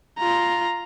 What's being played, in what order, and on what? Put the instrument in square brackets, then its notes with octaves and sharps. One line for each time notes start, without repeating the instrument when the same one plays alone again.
[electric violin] F4 A#5